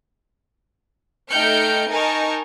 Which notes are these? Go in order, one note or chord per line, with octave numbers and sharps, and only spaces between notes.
A3 D#4 G5 F6 G6 C#7
D#4 A#4 G#5 A5 C#6